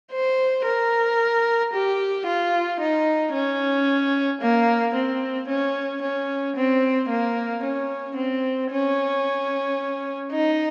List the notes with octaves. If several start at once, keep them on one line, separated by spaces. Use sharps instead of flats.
C5
A#4
G4
F4
D#4
C#4
A#3
C4
C#4
C#4
C4
A#3
C#4
C4
C#4
D#4